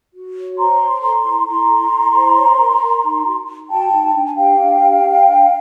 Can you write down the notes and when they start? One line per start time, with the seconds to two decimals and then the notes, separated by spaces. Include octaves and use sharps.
0.14 F#4
0.35 C#5
0.58 C5 A#5 C6
0.80 C5
1.02 A4 A#5 C6
1.24 E4
1.47 E4 A#5 C6
1.70 A4
1.91 E4
2.14 C5
2.36 C#5
2.59 A#4
2.81 A#4
3.04 D#4
3.26 F#4
3.48 D#4
3.70 F#4 G5 A5
3.92 D#4
4.15 D4 G5
4.26 G#5
4.36 G4 F5 G5
4.60 D4
4.81 G4
5.04 D4
5.27 D4